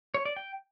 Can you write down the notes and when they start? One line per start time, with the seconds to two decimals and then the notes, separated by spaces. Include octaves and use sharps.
0.14 C#5
0.25 D5
0.36 G5